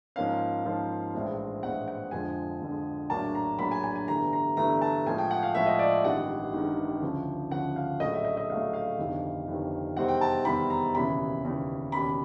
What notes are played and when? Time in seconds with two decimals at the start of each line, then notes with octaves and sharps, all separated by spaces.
0.16 G#2 F3 A#3 C#4 F5
0.65 G#2 F3 A#3 C#4
1.13 A#1 A2 E3 G#3 C4
1.62 A#1 A2 E3 G#3 C4 F#5
1.88 F#5
2.11 F2 D3 F3 G#3 G#5
2.61 F2 D3 F3 G#3
3.10 A#1 A2 F#3 A#3 D4 A5
3.35 A#5
3.59 A#1 A2 F#3 A#3 D4 B5
3.71 G#5
3.83 G#5
3.96 G#5
4.08 G1 G2 E3 A3 A#5
4.33 A#5
4.57 G1 G2 E3 A3 A#5
4.82 A5
5.06 A2 F3 G#3 G#5
5.18 G5
5.31 F#5
5.43 F5
5.55 A2 F3 G#3 E5
5.67 D#5
5.79 D5
6.04 A1 G2 D#3 G#3 F#5
6.53 A1 G2 D#3 G#3
7.02 D2 C#3 F3
7.51 D2 C#3 F3 F#5
7.76 F5
8.00 A#1 A2 F#3 A3 D#5
8.13 E5
8.25 D#5
8.37 D#5
8.49 A#1 A2 F#3 A3 F5
8.73 F5
8.99 G1 F2 C3 D#3
9.47 G1 F2 C3 D#3
9.96 E2 C3 D#3 G3 C4 F#5
10.08 G5
10.21 A5
10.45 E2 C3 D#3 G3 C4 B5
10.70 A#5
10.95 E1 D#2 C#3 E3 B5
11.44 E1 D#2 C#3 E3
11.92 E1 D#2 C#3 B5